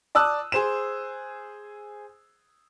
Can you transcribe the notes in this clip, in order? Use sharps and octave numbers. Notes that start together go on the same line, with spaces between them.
D5 A5 D#6 E6 F#6
G#4 C5 E7